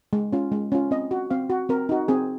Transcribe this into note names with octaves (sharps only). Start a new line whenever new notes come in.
G#3
C#4 F4
G#3
C#4 F4
C4 D#5
F#4
C4 F5
F#4
C4 A#4
D#4 F#4
C4 G#4